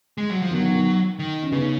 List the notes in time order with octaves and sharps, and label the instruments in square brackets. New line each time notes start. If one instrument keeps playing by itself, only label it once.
[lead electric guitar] G#3
F#3
F3
[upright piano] B2 D#3
[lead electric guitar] F#3
[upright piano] B2 D#3
[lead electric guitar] D#3
[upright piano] C#4
[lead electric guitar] C#3 [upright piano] B3 D#4